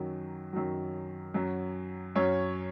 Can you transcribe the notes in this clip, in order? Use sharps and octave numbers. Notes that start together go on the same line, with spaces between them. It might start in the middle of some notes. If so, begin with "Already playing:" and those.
Already playing: F#2 D#3 F#3
F#2 D#3 F#3
F#2 F#3
F#2 F#3 C#4 C#5